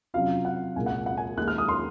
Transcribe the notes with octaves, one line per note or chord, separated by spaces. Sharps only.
C3 F#3 C#4 F4 F5
F#5
C2 A#2 G#3 G#5
F#5
F#5
G#5
D#2 D#3 G#3 F#6
F6
D#6
C6